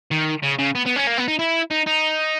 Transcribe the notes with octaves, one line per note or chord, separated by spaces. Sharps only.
D#3
C#3
C#3
B3
B3
C#4
A#3
B3
D#4
E4
D#4
D#4